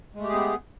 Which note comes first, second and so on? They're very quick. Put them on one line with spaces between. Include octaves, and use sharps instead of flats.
G#3 A3 G4 G#4 B3